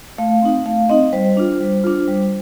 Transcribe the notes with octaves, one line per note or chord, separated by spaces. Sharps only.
A3 F5
C4 D#4
A3 F5
C4 D#4 D#5
G3 C5
D4 F4
G3
D4 F4
G3